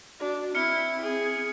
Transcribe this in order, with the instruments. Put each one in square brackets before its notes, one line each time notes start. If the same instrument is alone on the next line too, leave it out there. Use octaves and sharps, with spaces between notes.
[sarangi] D4 [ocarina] F#4
[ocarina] C4 [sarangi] E4 [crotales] F6 C#7
[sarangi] G#4